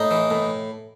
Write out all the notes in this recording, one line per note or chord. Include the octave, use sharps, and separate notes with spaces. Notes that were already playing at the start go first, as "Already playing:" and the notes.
Already playing: A2 D#4
E3
A2